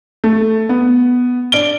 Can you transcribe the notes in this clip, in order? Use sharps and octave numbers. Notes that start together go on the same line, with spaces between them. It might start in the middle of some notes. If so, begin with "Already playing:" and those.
A3
B3
D4 D7 G7